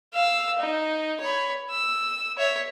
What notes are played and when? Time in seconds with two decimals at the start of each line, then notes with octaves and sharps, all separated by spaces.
0.14 F5 E6
0.59 D#4
1.21 C#5 B5
1.70 E6
2.38 C#5 E5